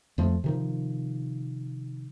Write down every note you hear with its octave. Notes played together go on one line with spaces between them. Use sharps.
F2 F3 A3
C3 D#3 F3